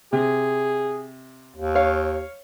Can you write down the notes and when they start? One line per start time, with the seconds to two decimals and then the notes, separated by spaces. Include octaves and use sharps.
0.13 C3 G#4
1.56 D#2
1.75 C#5 F5